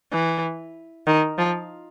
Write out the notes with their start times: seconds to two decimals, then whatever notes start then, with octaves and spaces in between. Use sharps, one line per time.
0.12 E3
1.07 D#3
1.38 F3